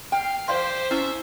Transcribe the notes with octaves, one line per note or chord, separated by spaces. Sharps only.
F5 G5
G4 C5 D5 F5 C6
C#4 E4 E5